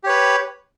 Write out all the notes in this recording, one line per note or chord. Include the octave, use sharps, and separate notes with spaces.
G4 B4 C#5